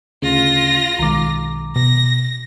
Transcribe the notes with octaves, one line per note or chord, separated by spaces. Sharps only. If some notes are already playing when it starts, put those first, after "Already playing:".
D2 C#3 C#4 F4 A#6
B1 D#3 G#3 A#5 D6
B2 A#6